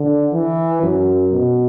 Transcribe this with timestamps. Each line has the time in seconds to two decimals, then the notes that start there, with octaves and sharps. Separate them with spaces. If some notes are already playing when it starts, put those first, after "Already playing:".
Already playing: D3
0.33 E3
0.83 F#2
1.33 B2